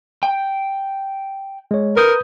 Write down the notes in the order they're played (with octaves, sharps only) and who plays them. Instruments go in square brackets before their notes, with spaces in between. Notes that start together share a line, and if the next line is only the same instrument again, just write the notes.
[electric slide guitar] G5
[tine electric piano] G#3 C#5
[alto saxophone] A#4 [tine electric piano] B4 D#6 G6